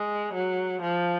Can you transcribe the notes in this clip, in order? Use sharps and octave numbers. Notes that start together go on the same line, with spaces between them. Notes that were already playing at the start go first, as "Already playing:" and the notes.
Already playing: G#3
F#3
F3